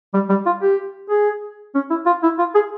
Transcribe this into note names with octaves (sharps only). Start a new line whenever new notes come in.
G3
G3
F4
G4
G#4
C#4
E4
F4
E4
F4
G#4